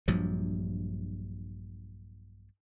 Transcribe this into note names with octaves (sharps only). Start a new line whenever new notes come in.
A#1 G2 F3 F#3